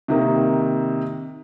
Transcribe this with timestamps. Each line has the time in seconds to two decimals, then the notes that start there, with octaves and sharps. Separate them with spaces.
0.08 C3 D#3 A#3